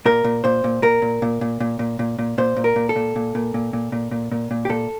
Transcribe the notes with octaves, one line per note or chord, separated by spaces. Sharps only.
A#2 A#4
A#2
A#2 C5
A#2
A#2 A#4
A#2
A#2
A#2
A#2
A#2
A#2
A#2
A#2 C5
A#2
A#4
A#2
A4
A#2
A#2
A#2
A#2
A#2
A#2
A#2
A#2
A#2
G4
A#2 A4